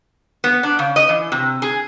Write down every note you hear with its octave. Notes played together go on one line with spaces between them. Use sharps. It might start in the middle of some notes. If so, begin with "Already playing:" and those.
B3
D4
C#3
D#5
E3
C3
G#4